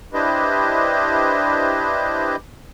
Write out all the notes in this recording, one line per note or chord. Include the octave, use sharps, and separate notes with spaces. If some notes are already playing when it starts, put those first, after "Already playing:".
D4 E4 G4 B4 C5 D#5